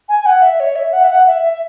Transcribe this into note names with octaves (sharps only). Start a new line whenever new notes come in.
G#5
F#5
E5
C#5
E5
F#5
E5
F#5
E5
E5